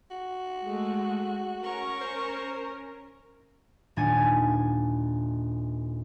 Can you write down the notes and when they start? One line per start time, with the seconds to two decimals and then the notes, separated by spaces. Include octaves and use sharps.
0.11 F#4
0.63 G#3 A3
1.63 C#4 A#4 C#6
2.01 C5
3.96 D#1 D4 G#5 A6 C#7